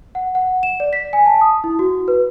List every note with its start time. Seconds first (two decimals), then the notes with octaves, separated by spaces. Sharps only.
0.15 F#5
0.35 F#5
0.63 E7
0.80 D5
0.93 B6
1.13 G#5
1.26 A5
1.41 D#6
1.64 E4
1.79 F#4
2.08 B4